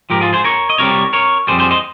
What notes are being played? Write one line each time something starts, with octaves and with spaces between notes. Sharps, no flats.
G#2 F3 G4 A#4
F4 G#4
G#4 C5
A#4 C#5
D#5
C2 C3 G3 A#4 C#5
A#4 C#5
F2 C3 G3 G#4 C5
G#4 C5
C5 D#5